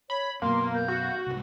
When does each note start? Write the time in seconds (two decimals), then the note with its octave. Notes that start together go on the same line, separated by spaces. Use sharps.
0.10 C#5 B5
0.42 F#2 B2 A#3 F5 C6
0.75 G6
0.88 F#4
1.27 C2 G#2